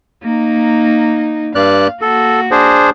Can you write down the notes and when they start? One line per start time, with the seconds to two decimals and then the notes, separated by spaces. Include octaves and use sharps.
0.23 A#3 D#4
1.55 G2 D5 F5 F#6
2.02 A#3 F#4 A4
2.51 D4 G#4 C5